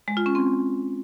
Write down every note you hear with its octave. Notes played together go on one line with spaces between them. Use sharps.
G#3
F4
C#4
C4